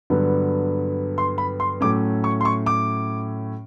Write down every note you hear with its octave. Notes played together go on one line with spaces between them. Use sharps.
G2 D3 F#3 B3
C6
B5
C6
A2 F#3 A3 C#4 D6
C#6
C6
C#6
D6